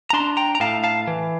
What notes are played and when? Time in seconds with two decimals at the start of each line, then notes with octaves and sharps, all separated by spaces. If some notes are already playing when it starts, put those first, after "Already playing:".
0.10 A#5
0.13 D4 A5 C6
0.37 G5 A#5
0.55 A#5
0.60 A2 F5 A5
0.84 F5 A5
1.07 E3